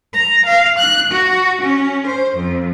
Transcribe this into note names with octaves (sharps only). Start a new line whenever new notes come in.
A#5
F5
F#6
F#4
C#4
C5
F2